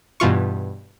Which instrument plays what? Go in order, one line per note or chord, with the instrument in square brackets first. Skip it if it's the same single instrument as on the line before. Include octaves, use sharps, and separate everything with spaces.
[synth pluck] G2 B2 E3 F4 C#6